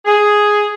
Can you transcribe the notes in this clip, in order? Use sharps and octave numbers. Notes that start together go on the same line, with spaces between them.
G#4